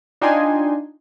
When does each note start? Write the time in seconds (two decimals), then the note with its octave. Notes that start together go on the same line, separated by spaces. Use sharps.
0.21 D4 D#4 F4 G5 G#5 C6